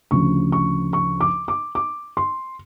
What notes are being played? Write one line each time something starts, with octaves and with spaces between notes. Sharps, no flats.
D2 C#3 F3 C#6
C#6
C#6
D6
D6
D6
C6